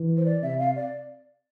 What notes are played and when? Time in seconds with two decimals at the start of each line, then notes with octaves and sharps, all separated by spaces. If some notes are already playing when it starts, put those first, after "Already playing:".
Already playing: E3
0.17 C5
0.26 D5
0.43 C3 E5
0.59 F5
0.76 D5